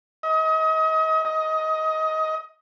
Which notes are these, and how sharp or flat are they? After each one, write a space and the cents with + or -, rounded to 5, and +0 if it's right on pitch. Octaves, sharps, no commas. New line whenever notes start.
D#5 +35
D#5 +20